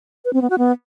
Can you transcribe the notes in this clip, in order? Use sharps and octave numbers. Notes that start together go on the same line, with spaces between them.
B4
C4
B3
F#4
B3